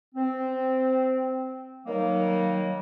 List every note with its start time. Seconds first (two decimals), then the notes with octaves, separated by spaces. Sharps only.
0.15 C4
1.86 D#3 F#3 G3 A#3